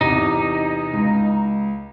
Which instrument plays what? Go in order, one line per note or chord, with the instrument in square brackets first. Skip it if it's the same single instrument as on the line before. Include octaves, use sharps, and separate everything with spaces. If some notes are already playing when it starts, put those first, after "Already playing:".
[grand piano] E2 C3 [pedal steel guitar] D#4
[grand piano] C#2